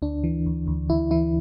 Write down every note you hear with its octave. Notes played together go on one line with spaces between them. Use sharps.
D2 D4
E3
D2
D2
D2 E4
E3 E4